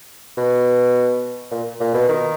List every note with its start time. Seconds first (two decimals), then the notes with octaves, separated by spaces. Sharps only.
0.37 B2
1.51 A#2
1.80 A#2
1.94 B2
2.09 D#3